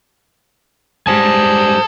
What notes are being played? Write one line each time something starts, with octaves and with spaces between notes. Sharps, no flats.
G#2 G3 G#4 A4 C5 G#5